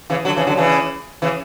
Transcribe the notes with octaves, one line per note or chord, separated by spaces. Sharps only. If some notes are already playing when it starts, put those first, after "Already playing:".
C#3 E3
D3 F#3
C#3 E3
D3 F#3
C#3 E3
C#3 E3